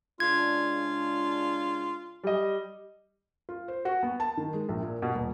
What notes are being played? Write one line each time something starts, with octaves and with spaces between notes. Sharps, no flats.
C#3 G#3 D4 F4 G#6
G3 D#5
F4
C5
F#4
B3
A5
D#3
G#3
A#1
A#2
B2
D#1